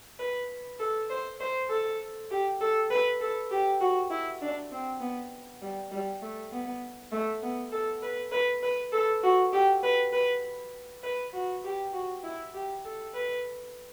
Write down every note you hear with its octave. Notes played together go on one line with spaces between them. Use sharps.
B4
A4
C5
C5
A4
G4
A4
B4
A4
G4
F#4
E4
D4
C4
B3
G3
G3
A3
B3
A3
B3
A4
B4
B4
B4
A4
F#4
G4
B4
B4
B4
F#4
G4
F#4
E4
G4
A4
B4